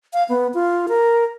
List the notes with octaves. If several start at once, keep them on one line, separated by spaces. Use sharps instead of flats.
F5
B3
F4
A#4